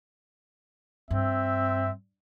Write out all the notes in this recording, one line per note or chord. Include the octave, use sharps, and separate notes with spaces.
G2 C4 E5